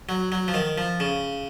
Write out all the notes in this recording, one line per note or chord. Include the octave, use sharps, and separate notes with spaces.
F#3
F#3
F3
D#3
F3
C#3